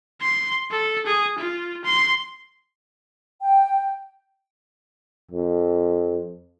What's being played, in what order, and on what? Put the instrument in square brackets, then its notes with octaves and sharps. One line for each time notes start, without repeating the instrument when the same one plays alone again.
[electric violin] C6
A4
G#4
F4
C6
[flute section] G5
[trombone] F2